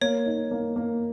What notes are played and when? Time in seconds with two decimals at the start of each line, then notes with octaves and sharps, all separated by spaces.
0.01 A#3 C#5
0.26 D#4
0.51 A#3
0.76 A#3